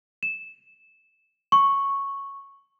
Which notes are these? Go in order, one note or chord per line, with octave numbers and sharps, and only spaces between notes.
E7
C#6